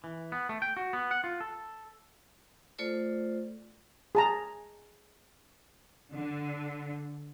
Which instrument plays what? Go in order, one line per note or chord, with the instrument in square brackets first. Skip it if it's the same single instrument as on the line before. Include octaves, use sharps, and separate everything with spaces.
[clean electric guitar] E3
B3
A3
G5
F#4
B3
F#5
F4
A4
[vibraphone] A3 F4 A4 C5 D5
[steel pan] G#4 A5 A#5
[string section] D3